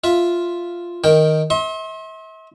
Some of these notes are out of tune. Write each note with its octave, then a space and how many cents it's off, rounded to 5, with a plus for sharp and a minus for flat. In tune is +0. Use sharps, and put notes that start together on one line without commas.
F4 +0 E5 +0
D#3 +0 A#4 +0 G5 +0
E5 -40 C6 +35